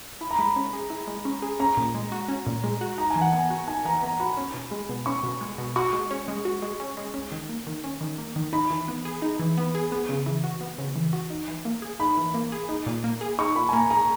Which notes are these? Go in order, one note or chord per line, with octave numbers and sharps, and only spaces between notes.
E4 B5
A#5
G#3 B5
C#4
G#4
E4
G#3
C#4
G#4
C#4 A#5
A#2
G#3
F#4
C#4
A#2
G#3
F#4
D#4 A#5
G#5
E3
F#5
B3 G#5
F#4
D#4 G#5
E3 A#5
B3 A#5
F#4 B5
C#4
B2
G#3
B2
C#4 C#6
B2
G#3
B2
F#4 C#6
G#3
C#4
G#3
F#4
G#3
C#4
G#3
C#4
D#3
A#3
D#3
C#4
D#3
A#3
D#3
D#4 B5
E3
B3
G#4
D#4
E3
B3
G#4
B3
C#3
E3
F#4
B3
C#3
E3
F#4
D#4
E3
A#3
G#4
D#4 B5
E3
A#3
G#4
D#4
A#2
A#3
G#4
D#4 C#6
A#2 B5
G#5
A#3 A#5
G#4 A#5